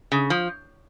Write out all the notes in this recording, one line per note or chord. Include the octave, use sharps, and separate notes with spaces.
C#3
F3